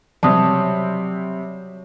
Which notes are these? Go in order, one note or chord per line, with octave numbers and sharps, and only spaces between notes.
C3 F#3 G3 A5 D#6